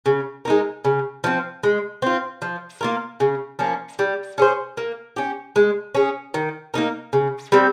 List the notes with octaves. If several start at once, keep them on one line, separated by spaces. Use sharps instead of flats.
C#3
G#3 D#4 A#4
C#3
F3 C4
G#3
C4 F4
F3
A#3 F4 A#4
C#3
F3 A#3 C#4
G3
C#4 G#4 C5
A#3
C#4 G4
G#3
C#4 G#4
D#3
A#3 D#4 A#4
C#3
G3 C4